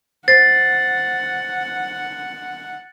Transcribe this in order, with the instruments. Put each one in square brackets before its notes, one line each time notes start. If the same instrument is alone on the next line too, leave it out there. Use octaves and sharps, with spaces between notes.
[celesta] C5 C7 [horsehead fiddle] F#5 [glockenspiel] A6